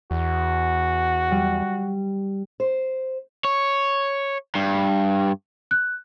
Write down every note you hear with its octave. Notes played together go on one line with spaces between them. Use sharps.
E2 F#4
G3
C5
C#5
G2
F#6